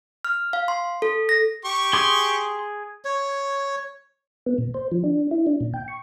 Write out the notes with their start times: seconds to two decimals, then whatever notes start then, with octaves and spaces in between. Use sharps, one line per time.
0.25 F6
0.53 F5
0.68 C6
1.02 A4
1.29 A#6
1.65 G4 C#6
1.93 G#4 C6 D6 D#6
3.05 C#5
4.46 B3
4.58 A#2
4.74 C5
4.91 F3
5.04 D4
5.31 E4
5.47 D4
5.61 A#2
5.74 G5
5.88 C#6